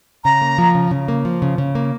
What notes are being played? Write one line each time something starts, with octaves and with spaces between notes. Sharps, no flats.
C#3 A#5
A#3
F3
C#3
C#3
A#3
F3
C#3
C#3
A#3